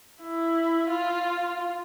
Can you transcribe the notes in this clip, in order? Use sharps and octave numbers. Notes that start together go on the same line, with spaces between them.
E4
F4